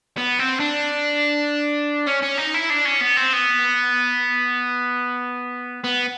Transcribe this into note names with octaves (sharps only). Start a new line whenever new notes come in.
B3
C4
D4
C#4
C#4
D#4
E4
D4
C#4
B3
C4
B3
B3